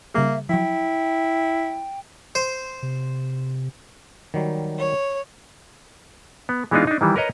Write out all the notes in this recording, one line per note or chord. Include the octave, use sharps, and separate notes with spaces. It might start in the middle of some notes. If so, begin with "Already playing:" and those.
C#3 G3 A#3 G#4 E5
F3 F#3 E4 G5
C5
C3
D#3 F#3 G3
C#5
B3
E3 G#3 B3 D4 D#4 F4
D4 D#4
D#3 E3 G3
A#4 B4 C#5 D#5 A#5